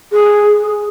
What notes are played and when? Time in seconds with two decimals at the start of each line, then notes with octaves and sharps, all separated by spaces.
0.12 G#4